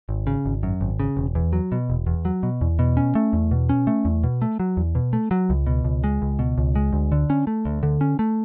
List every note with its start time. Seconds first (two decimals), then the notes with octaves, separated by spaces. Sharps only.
0.09 G#1
0.27 C#3
0.46 G#1
0.63 F#2
0.81 G#1
1.00 C#3
1.17 E1
1.35 E2
1.53 F#3
1.72 B2
1.90 E1
2.07 E2
2.25 F#3
2.43 B2
2.61 E2
2.79 B2
2.97 C#4
3.15 A3
3.33 E2
3.51 B2
3.69 C#4
3.87 A3
4.05 E2
4.24 B2
4.42 A3
4.60 F#3
4.77 E2
4.95 B2
5.13 A3
5.31 F#3
5.50 C#2
5.67 B2
5.85 C#2
6.04 G#3
6.22 C#2
6.39 B2
6.58 C#2
6.76 G#3
6.93 D2
7.12 D3
7.30 C#4
7.47 A3
7.65 D2
7.83 D3
8.01 C#4
8.19 A3